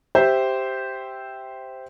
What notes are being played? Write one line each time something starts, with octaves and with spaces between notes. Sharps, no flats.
G4 C5 E5